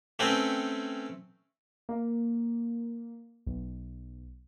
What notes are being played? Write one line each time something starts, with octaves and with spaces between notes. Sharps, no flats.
A3 C4 C#4 B4 G5
A#3
B1